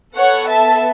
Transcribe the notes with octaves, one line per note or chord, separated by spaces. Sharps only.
B3 A4 C#5 F#5
E5 A5